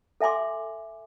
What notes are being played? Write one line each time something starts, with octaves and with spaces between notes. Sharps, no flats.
A4 E5 G#5 C6 D6